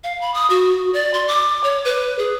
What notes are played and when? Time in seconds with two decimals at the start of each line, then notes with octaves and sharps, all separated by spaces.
0.04 F5
0.21 B5
0.34 D#6
0.50 F#4
0.94 D5
1.14 C6
1.28 D6
1.64 C#5
1.85 B4
2.19 G#4